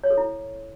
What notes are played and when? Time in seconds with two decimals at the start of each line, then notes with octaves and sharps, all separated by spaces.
0.04 C#5
0.10 A4
0.17 E4